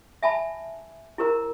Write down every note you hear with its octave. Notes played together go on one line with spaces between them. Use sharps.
E5 G#5 A5 B5
E4 G4 A#4 C5 A#5